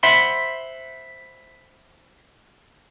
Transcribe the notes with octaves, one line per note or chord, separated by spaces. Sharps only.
C5 E5 F#5 B5 C6